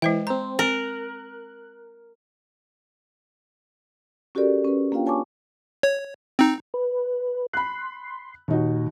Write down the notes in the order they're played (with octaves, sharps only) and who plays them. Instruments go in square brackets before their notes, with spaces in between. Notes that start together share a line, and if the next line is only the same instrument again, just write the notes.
[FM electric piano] E3 [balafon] G#3 C5 G5
[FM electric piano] C4 C5 [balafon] A#5
[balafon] C4 [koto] A#4 [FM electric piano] F#6
[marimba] C#4 F#4 G4 A4 A#4 D5
C#4 B4
A#3 D4 F4 F5 G5
C#5 G#5 A5 C#6 D6
[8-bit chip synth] C#5
C4 D#4
[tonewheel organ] B4
[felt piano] B5 F#6 [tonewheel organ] C6
[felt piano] D#2 D#4 F#4 [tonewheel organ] A#2